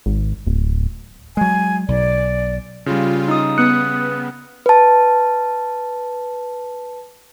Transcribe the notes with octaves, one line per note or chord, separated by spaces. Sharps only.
G#1
D1
F#3 G#3 G#5
B1 D5
C#3 G3 F4
D#4 D#6
B3 D#6 F#6 C#7
B4 A5